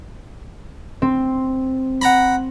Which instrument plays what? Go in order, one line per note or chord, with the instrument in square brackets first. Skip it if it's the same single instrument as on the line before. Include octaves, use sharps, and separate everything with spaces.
[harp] C4
[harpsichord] F#5 A#5 B5